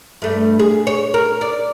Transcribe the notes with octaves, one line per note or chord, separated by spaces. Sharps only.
G2 A3
G#4
C#5
A#4
D5